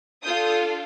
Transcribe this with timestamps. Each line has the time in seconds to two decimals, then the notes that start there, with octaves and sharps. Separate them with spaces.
0.23 D4 F4 A4 D#6 G6